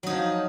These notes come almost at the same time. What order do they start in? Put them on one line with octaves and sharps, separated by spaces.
F#3 D#4 F3